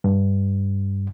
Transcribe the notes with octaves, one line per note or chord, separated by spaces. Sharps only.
G2